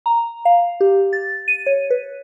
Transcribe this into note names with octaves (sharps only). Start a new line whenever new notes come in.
A#5
F5
G4
A6
D#7
C#5
B4